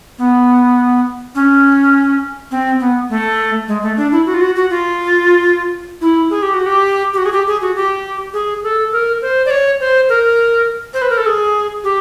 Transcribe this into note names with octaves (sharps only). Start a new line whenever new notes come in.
B3
C#4
C4
B3
A3
G#3
A3
D4
E4
F#4
F4
F#4
F#4
F4
E4
G#4
G4
F#4
G4
G4
F#4
G#4
G4
G#4
F#4
G4
G#4
A4
A#4
C5
D5
C#5
C5
A#4
C5
B4
A#4
A4
G#4
G4